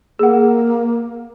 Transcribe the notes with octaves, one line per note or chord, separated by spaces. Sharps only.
A#3 G#4 F#5